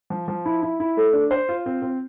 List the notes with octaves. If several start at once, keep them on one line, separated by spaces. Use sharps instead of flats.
F3
F3
E4
E4
E4
A3
D4
C5
F4
C4
C4